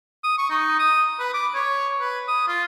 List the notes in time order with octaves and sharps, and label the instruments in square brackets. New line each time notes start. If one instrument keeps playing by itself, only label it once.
[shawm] D#6
C#6
D#4
D#6
B4
D6
C#5
B4
D#6
F4